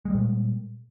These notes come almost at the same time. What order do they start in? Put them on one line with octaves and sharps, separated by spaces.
G#3 G3 A#2